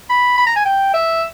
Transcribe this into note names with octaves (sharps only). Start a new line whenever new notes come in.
B5
B5
A#5
G#5
G5
E5